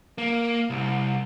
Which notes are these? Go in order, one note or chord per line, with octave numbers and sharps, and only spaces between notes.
A#3
C2